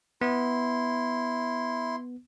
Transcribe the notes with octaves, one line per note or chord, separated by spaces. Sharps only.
B3 E4 C6